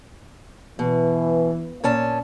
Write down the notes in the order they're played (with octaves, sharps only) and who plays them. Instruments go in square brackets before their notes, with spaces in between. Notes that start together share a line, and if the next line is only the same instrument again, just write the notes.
[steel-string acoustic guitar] B2 [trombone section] E3
[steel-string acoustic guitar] A#2 C#4 A5